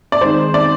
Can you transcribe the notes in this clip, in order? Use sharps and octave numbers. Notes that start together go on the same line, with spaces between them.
D5
D#3 G#3 C4 D#4 G#4 C5
D5